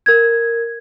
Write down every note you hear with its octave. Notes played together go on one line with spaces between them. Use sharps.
A#4 G#6